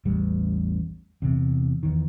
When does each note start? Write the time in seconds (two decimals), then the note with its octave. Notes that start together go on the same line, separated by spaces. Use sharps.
0.05 A1 E2 G3
1.22 E2 C3
1.83 E2 D#3